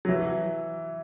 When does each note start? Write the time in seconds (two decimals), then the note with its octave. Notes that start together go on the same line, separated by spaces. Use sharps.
0.05 F#3
0.09 E3